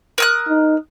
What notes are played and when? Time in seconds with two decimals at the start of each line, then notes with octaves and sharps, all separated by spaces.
0.18 A#4 D#6 F#6
0.48 D#4